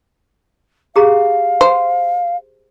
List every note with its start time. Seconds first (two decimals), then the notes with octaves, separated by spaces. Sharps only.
0.96 G4 G#4 F5 A#5
1.61 C5